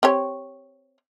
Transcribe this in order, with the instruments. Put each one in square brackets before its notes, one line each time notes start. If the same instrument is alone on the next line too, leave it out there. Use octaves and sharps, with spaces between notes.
[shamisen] C4 G4 C#5